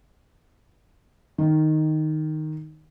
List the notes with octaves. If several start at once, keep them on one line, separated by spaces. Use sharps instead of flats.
D#3